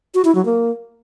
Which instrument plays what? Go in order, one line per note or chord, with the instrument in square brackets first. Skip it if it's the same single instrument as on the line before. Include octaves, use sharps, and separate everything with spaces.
[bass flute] F#4
E4
F#3
A#3